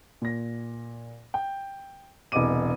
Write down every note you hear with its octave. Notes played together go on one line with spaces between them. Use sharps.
A#2 A#6
G5
E1 C2 E3 D#5 D6 D#7